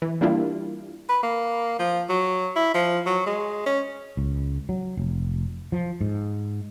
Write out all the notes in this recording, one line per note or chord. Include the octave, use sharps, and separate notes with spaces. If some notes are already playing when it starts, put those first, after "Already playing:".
E3
G3 A#3 D4 E4 F4 G4
B4
A#3
F3
F#3
E4
F3
F#3
G#3
C#4
C#2
F#3
F1
F3
G#2